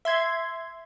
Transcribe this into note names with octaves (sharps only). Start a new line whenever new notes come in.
E5 C6 G#6